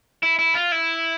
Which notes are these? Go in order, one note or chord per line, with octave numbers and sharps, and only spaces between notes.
E4
E4
F4
E4